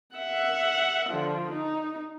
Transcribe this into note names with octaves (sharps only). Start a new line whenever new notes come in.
E5 F#5
D3 F3
D#4